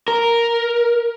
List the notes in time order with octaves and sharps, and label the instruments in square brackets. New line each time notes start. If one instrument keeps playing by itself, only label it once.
[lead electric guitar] A#4